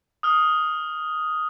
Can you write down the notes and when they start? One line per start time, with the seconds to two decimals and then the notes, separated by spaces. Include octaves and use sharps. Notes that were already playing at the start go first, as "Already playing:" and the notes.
0.23 D#6 F6